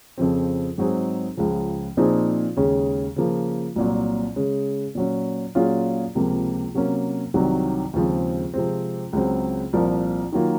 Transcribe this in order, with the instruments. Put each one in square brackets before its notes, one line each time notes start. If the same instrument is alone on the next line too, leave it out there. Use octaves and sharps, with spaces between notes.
[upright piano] F2 C#3 F3 C4
G#2 F#3 C4 D#4 G#4
C#2 C#3 F3
A#2 F3 C4 D#4 G#4
D#2 C#3 G#3 C#4
C#3 F3 A#3
C2 A#2 F#3
C#3 G#3 C#4
A#2 F#3 C#4
A#2 F#3 C#4 F4 G#4
C#2 C3 F3 A#3
C3 F#3 A#3 C#4
C2 C3 D#3 F#3
D#2 C#3 F3 G#3 C4
C3 F3 G#3 C4
C#2 C#3 F#3 C4
C2 A#2 F3 A#3
D#3 F#3 A#3 F4